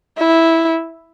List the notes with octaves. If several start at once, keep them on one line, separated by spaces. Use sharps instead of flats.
E4